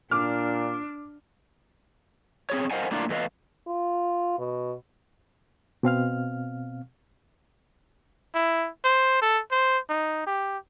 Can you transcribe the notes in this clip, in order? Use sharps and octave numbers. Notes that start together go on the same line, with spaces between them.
A#2 D4 D6 F6
C4 G#4 C#5
A#4 C5 D#5 F5 F#5 G#5
A2 A#3 D4 F4
E2 A3 B4 D#5 F5
F4
B2
B2 C4 F5 F6
E4
C5
A4
C5
D#4
G4